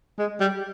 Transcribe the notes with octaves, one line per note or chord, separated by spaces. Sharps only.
G#3
G3